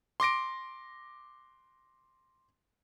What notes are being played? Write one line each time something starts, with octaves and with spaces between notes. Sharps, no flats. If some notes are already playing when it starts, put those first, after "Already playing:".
C6 D6 A#6 D7